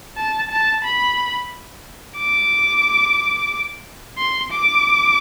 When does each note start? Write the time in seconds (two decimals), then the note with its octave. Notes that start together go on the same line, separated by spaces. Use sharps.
0.17 A5
0.51 A5
0.84 B5
2.18 D6
4.18 C6
4.52 D6